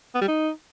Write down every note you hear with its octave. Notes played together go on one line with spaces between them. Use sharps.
B3
G3
D#4